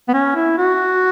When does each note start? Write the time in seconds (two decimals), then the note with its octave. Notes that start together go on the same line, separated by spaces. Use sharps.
0.08 B3
0.13 C#4
0.36 E4
0.58 F#4